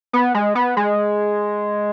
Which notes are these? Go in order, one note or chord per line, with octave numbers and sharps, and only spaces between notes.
B3
G#3
B3
G#3